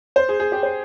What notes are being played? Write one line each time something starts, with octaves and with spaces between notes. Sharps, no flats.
C5
G#4
G#4
G4
C5